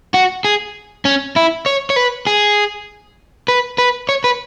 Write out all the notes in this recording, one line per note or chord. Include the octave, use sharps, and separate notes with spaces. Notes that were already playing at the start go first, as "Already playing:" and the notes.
F#4
G#4
C#4
E4
C#5
C#5
B4
G#4
B4
B4
C#5
B4